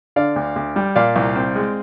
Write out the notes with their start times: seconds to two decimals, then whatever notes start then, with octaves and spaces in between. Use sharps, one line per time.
0.16 D3 D5 F5
0.36 D2
0.56 D2
0.76 G3
0.96 A#2 D5 F5
1.16 C2
1.36 C4
1.56 G#3